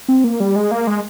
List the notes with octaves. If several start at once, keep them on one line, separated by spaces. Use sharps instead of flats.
C4
A#3
G3
G#3
A#3
G#3